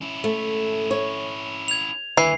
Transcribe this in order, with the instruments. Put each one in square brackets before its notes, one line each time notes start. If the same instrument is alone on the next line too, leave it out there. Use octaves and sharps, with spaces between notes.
[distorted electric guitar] C#4 E4
[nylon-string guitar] A3
C#5
[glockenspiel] G#6 F7
[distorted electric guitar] D#2 D3 [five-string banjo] E3 [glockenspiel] C7